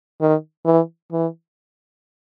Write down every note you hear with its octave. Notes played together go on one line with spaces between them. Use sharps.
D#3
E3
E3